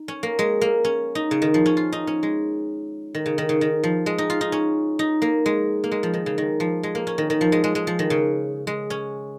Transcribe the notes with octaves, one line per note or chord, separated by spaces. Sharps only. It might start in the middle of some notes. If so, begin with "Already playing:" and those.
Already playing: D#4
C#4
A#3
G#3
A#3
C#4
D#4
C#3
D#3
F3
C#4
F4
D#4
C#4
G#3
D#3
C#3
D#3
C#3
D#3
F3
G#3
D#4
F4
D#4
C#4
D#4
A#3
G#3
A#3
G#3
F3
D#3
C#3
D#3
F3
G#3
A#3
C#4
D#3
D#3
F3
G#3
G#3
G#3
F3
D#3
C#3
G#3
C#4